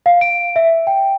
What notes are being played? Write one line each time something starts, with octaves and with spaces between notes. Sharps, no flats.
F5
D7
E5
G5